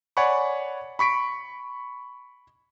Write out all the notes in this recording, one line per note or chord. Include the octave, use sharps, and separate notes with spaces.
C#5 D5 F#5 G#5 B5 C#6
B5 C#6 B6 D7